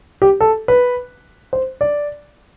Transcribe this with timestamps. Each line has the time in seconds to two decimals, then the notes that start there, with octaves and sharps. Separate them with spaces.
0.22 G4
0.40 A4
0.68 B4
1.53 C5
1.81 D5